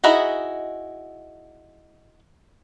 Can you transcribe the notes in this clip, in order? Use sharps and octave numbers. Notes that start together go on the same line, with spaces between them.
D#4 E4 F#4 G#4 D#5